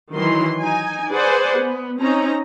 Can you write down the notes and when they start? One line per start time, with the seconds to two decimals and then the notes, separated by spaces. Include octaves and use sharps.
0.14 D#3 E3 F#3 C6
0.60 D#4 G#5
1.10 G#4 B4 C5 D5 F#5 G#5
1.58 B3
2.01 C4 C#4 D#4 A#5